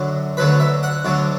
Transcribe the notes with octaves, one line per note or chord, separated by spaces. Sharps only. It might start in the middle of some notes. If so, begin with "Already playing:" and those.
Already playing: F#2 D3 F#3
D2 D3 F#3 B4
E5
F#5
D2 D3 F#3